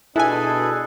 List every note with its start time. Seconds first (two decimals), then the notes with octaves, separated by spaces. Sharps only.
0.16 B2 D4 E4 G#4 A4 B4 G#5